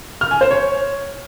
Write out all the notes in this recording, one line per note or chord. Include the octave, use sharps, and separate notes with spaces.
F6
G#5
C5
C#5